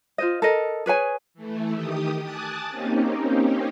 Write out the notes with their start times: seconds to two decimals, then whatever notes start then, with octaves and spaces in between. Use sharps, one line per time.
0.18 F4 C5 D#5
0.42 A4 A#4 D#5
0.86 G#4 B4 C#5 G#5
1.34 E3 A3
1.74 D#3 G4 D#6
2.21 G#5 A5 D6 D#6 F#6 A6
2.70 A#3 C4 C#4 D#4 G4